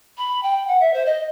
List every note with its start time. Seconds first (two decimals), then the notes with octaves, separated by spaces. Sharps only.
0.17 B5
0.43 G5
0.67 F#5
0.80 E5
0.93 C5
1.05 D#5